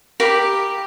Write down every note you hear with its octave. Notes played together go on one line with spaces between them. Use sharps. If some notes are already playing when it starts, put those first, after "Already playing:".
G4 A#4 F5 B5